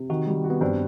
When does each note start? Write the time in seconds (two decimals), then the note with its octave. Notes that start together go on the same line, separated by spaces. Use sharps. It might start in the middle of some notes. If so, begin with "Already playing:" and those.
Already playing: C3
0.10 D#3 F#4
0.27 G3
0.44 F#4
0.50 B3
0.61 G2 C4